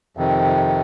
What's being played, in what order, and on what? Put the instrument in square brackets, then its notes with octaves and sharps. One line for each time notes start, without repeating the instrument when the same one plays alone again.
[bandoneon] F2 C3 D#3